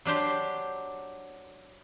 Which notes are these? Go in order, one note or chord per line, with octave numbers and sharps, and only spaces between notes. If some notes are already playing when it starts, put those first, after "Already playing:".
F#3 D4 G4 C5